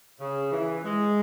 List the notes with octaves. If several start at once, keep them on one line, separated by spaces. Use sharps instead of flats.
C#3
E3
G#3